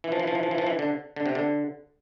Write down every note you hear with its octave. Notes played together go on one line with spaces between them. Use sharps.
E3
F3
E3
F3
E3
F3
E3
F3
E3
D3
D3
C3
D3